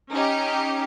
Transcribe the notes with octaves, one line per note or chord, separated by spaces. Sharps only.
C#4 D#4 G4